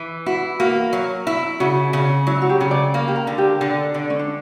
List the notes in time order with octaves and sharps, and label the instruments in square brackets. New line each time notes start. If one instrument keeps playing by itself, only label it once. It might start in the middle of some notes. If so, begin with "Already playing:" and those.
Already playing: [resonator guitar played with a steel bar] E3
[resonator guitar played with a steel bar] E4 [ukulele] F#4
[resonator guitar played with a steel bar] A#3 [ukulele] F#4
[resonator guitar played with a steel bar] F#3
E4
[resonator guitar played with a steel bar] C#3 [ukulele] F#4
[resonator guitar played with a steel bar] C#3
[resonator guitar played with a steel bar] F#3 [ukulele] E4
[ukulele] F#4
G4
[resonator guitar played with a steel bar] C#3
[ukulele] D5
[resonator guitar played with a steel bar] A#3
[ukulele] G4
A#4
[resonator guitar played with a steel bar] D3
[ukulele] G4
[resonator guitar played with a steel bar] D3
D3
[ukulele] C#4
D4